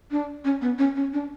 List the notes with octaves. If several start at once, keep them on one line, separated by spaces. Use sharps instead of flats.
D4
C#4
B3
C#4
C#4
D4